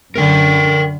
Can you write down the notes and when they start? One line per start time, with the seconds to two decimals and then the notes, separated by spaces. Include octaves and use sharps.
0.15 F#2 D3 A#4 G5